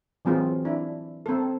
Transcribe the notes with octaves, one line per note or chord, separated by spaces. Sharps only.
E3 F#3 C4 F4 G#4
D4 E4
C4 A4